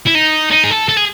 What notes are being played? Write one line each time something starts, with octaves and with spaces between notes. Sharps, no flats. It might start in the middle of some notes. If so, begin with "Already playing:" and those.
E4
D#4
D#4
G#4
A4
A4
G#4